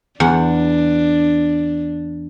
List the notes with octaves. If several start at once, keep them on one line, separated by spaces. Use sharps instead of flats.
E2 D4 F#5